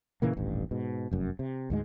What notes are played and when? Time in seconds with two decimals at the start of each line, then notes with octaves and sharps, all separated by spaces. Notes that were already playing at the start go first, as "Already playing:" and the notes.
0.22 A#2 C#3 E3 A#3
0.37 D#1 A1 G2
0.71 G#2 B2
1.11 F1 F#2
1.39 C3
1.70 D2 G#2 G#3